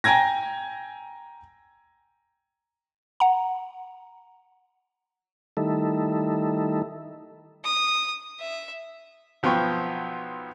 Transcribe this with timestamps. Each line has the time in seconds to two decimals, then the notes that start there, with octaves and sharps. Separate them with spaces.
0.04 G5 G#5 A#5 G#6 A#6
3.20 F#5 A#5
5.57 D#3 G3 A3 D#4 E4 A4
7.64 D#6
8.39 E5
9.43 B1 F3 B3 C5 G5 C#6